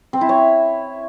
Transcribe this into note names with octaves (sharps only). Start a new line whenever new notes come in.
C4
E4
C#5